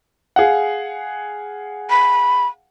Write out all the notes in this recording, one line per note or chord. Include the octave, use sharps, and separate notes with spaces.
G#4 F5 F#5
B5